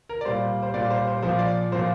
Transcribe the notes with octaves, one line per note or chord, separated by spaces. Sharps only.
A#4
D5
A#2 G3 C5
C5
A#2 G3 D5
C5
C5
A#2 F3 C5
D5
A#2 F3 C5